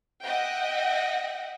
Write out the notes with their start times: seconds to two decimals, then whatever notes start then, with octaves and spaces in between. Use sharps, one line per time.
0.23 D#5 E5 F#5 G5